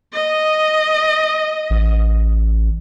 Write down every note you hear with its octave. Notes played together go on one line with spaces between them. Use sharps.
D#5
A1